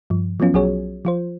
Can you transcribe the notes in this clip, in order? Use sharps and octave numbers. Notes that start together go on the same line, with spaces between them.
G2 F3
F3 F#3 B3 C#4 F4
B1 F#3 F#4 G#4 C#5
F3 F4 C5